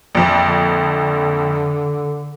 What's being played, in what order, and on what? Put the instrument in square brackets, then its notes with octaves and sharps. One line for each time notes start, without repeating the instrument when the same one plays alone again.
[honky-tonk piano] A#1 F2
[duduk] D3